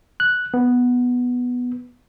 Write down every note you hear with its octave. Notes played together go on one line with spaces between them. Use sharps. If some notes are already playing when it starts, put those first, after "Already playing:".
F#6
B3